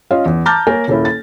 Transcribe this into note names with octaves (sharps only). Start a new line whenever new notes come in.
C#4 F4 D#5 F5
E2
A5 A#5 D6 F6 G6 A6
A#3 A#4 C#5 G#5
D#1 A#3 C#4 E4
A6